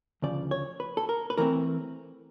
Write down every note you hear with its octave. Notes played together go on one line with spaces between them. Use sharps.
D2 C#3 F3 D5
C#5
B4
A4
A#4
B4
E3 A3 C4 A#4